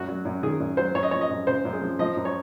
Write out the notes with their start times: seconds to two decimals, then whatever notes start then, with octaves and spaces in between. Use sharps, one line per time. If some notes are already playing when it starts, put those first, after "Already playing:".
Already playing: F#2 F#4
0.08 F#3
0.25 F#2
0.43 D#3 G#4
0.60 F#2
0.77 F#3 C5
0.95 F#2 C#5
1.03 D#5
1.11 F3 C#5
1.21 D#5
1.30 F#2
1.47 C#3 C5
1.65 F#2
1.73 G#4
1.82 F3
1.99 F3 D#5
2.17 F#2
2.25 C#5